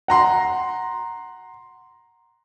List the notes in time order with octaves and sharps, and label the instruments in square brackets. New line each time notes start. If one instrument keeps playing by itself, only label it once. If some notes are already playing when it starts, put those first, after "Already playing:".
[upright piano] F#5 A#5 C6